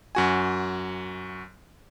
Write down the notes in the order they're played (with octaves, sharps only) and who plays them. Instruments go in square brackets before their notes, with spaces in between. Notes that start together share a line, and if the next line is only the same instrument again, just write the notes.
[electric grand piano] F#2 F#4 G#5